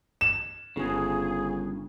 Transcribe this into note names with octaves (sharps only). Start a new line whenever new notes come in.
E7
G1 G2 C#3 G#4